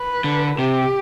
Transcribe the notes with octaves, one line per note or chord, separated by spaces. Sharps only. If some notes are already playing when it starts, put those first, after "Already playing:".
Already playing: B4
D3
C3 G4